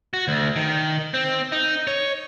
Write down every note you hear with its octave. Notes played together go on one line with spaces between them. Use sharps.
F#4
D2
D#3
C4
D#4
C#5